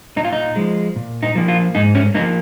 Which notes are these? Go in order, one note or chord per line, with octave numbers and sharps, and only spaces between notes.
A#2 D#4
F4
D#4
F3 G#3
A#2
D#4
F3 A#3
F4
G#2 D#4
C#4
F3 A#3 D#4